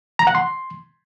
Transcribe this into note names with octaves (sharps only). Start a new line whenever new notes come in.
A#5
F#5
C6